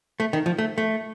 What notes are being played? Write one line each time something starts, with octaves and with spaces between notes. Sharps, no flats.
A3
D#3
F3
A3
A3